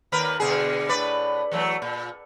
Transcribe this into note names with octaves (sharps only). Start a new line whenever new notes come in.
D#2 A#4 B4
B2 D3 G#4
A2 B4 D5
E3 F#3 A3
A#2